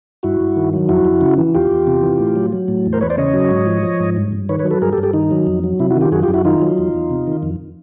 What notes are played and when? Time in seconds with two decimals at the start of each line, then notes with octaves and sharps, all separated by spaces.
0.23 G2 E4 F#4
0.41 G2
0.56 D#3
0.73 F#3
0.89 F2 E4 F#4
1.05 F2
1.21 C#3
1.38 E3
1.55 E2 F4 G4
1.71 E2
1.87 C3
2.03 E3
2.19 A2
2.36 F#3
2.53 F#3
2.68 A2
2.86 E2
2.93 A#4 C5
3.01 E2 B4 C#5
3.10 C5 D5
3.18 C#3 C#5 D#5
3.34 F#3
3.51 G#2
3.67 F3
3.83 F3
4.00 G#2
4.17 G2
4.32 G2
4.49 D#3 B4 C#5
4.59 B4 C#5
4.64 F#3
4.71 A4 B4
4.82 G2 G#4 A#4
4.93 G4 A4
4.98 G2
5.03 G4 A4
5.13 D#3 D#4
5.31 F#3
5.47 F2
5.64 F#3
5.79 C3 E4
5.90 E4 F#4
5.96 D#3
6.01 F4 G4
6.12 F#2 F#4 G#4
6.22 F4 G4
6.28 F#2
6.34 E4 F#4
6.45 D#3 D#4 F4
6.62 F#3
6.78 E2
6.94 E2
7.10 C3
7.27 D#3
7.43 F2